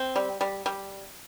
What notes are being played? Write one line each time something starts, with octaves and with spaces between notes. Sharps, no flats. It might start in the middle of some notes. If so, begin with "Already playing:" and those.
Already playing: C4
G3
G3
G3